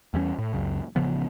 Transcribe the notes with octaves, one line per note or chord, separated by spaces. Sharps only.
E2 E3 G3 C#4
A2
C#2 F#2 C#3
A1 C#3 F3 B3